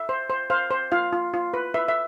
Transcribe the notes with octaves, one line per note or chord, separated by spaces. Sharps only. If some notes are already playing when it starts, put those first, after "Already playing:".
Already playing: E5
C5
C5
C5 F5
C5
F4 F5
F4
F4
B4
B4 E5
E5